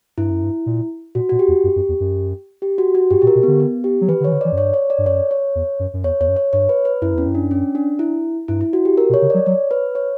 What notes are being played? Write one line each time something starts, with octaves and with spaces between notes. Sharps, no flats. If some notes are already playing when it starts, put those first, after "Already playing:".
G2 E4
F#2
G2
A#2
A#2 F#4
A#2 F#4
G4
E2
F#2
F#2
E2
F#2
G4
F#4
F#4
G2 G4
A#2 G4
A#4
B2
D3 B3
B3
G4
F#3
E3 B4
D3
E3 C#5
D3
E3 D5
F#2
G2 C#5
C#5
D5
G2
F#2 C#5
C#5
E2
F#2
F#2
E2 C#5
E2 C#5
F#2
C#5
G2 C#5
B4
B4
F#2 E4
E2 C#4
F#2
D4
C#4
D4
E4
G2 E4
E4
F#4
G4
A#4
B2
C#5
C#3
F#3 D5
F#3 C#5
B4
C#5